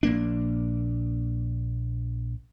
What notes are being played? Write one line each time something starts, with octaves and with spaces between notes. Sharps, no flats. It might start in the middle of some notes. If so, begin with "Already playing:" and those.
A#1 A#3 D4